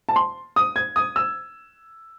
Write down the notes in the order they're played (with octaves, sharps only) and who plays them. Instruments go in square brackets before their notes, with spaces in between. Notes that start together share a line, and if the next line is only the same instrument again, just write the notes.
[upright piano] A5
C6
D#6
G#6
D#6
E6